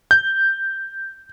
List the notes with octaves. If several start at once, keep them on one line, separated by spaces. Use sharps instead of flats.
G6